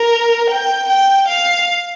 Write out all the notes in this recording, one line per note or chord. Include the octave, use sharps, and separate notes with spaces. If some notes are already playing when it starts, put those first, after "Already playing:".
Already playing: A#4
G5
G5
F5